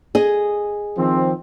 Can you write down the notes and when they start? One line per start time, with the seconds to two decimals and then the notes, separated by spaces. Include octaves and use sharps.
0.15 G#4 D#5
0.98 D#3 F3 C4